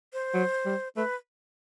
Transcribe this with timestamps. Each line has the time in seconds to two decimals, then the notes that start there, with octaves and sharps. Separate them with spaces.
0.13 C5
0.34 F#3
0.65 G3
0.96 A3 B4